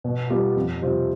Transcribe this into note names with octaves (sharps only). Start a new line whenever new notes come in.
B2
G3 B3 F4
F2
C3 G3 C4 F4